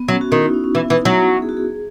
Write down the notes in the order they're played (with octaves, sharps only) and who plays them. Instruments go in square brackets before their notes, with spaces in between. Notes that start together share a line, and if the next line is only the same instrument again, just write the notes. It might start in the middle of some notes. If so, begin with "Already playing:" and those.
Already playing: [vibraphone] B3
[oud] F#3 [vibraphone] C#4
[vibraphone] F#4
[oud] D#3 [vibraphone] E4
[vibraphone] D#4
C#4
C#4
[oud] E3 [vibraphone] B3
[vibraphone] E4
[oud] E3 [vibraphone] D#4
[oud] F#3 [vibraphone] E4
[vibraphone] F#4
G#4
F#4
G#4